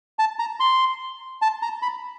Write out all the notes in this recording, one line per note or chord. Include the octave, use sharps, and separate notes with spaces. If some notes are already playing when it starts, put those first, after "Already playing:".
A5
A#5
C6
A5
A#5
B5